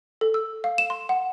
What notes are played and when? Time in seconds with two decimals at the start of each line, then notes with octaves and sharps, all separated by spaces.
0.21 A4
0.34 E6
0.64 F5
0.78 E7
0.90 C6
1.09 F#5